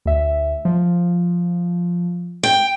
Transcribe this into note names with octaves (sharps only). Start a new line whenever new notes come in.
D2 E5
F3
G5